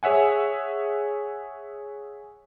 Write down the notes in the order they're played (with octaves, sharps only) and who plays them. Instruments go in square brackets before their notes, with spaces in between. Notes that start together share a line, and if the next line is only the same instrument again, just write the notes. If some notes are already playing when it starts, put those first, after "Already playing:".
[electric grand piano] G#4 C#5 E5 F#5 G#5